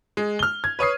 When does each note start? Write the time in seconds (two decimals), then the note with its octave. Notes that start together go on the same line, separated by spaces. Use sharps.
0.17 G#3
0.39 F6 G7
0.64 G#6
0.79 B4 C#5 D#6 C7